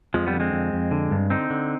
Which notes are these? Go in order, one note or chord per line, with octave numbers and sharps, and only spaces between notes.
F2 F3 G#3
G3 B3
D3
G#3 C4
F2
F2
D3
G2
D3 C4 D#4
D3